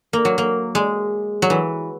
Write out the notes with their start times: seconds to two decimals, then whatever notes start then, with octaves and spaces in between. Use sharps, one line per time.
0.13 A#3
0.25 F#3
0.38 A#3
0.75 G#3
1.42 F#3
1.50 E3